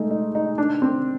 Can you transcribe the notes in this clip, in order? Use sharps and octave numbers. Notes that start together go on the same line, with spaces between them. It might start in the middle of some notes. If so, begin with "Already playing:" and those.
Already playing: G#3 A3 D#4
D#4
D#4
D4
C4